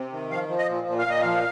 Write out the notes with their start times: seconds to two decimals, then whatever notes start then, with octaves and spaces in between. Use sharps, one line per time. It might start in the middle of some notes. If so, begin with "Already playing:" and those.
Already playing: C3
0.12 D#3
0.30 F3 F5
0.49 F3
0.58 D#5
0.68 A#2
0.87 A#2
0.99 F5
1.06 A#2 D#5
1.21 F3 F5